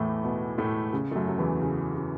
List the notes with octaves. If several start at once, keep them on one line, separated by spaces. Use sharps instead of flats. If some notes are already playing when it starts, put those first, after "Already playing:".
Already playing: E2 A2 E3 A3
B2 B3
A2 A3
C#3
A3
F#2 F#3
F#3
E2 E3
C#3
C#3